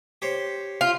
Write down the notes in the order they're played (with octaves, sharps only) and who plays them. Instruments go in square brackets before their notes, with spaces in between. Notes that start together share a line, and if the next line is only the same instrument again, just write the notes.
[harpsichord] G4 C5 C#5
[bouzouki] F4